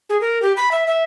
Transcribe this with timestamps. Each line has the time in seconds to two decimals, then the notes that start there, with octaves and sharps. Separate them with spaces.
0.09 G#4
0.21 A#4
0.42 G4
0.57 B5
0.71 E5
0.87 E5